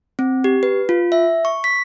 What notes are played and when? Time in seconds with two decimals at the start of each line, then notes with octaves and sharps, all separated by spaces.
0.19 C4
0.44 G4
0.63 B4
0.89 F4
1.12 E5
1.45 C#6
1.64 B6